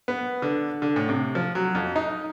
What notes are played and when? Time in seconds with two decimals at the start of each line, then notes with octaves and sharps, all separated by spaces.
0.08 B3
0.42 D3
0.82 D3
0.96 A2
1.09 C3
1.35 F3
1.55 F#3
1.75 F2
1.96 D#4